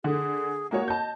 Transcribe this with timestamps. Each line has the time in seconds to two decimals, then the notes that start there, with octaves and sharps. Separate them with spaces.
0.04 D3 G#4
0.71 G#3 A#3 F#4 C#5
0.88 D#5 A5 G6